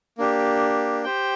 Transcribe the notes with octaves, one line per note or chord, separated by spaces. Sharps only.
A#3 D4 G4
G4 C5 G5